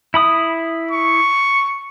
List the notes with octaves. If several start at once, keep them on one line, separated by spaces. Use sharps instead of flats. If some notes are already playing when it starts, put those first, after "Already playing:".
E4 B5 D#6
C#6